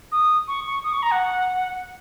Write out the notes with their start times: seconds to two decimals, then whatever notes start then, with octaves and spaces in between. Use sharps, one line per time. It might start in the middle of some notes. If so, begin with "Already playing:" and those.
0.12 D#6
0.48 C#6
0.66 C#6
0.84 D#6
0.93 C#6
1.03 A#5
1.11 F#5